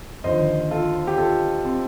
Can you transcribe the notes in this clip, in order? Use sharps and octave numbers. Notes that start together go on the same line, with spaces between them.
D#2 D3 F3 C5 D#5
F4 A4
G4
F4 A4
C4